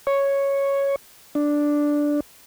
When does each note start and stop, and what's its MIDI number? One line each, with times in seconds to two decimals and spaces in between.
0.07 0.96 73
1.35 2.20 62